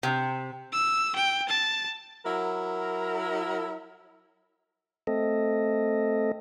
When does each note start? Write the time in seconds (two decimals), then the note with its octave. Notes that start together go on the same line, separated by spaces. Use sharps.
0.03 C3
0.72 E6
1.16 G5
1.48 A5
2.25 F#3 E4 A#4
5.07 A3 C4 A4 D#5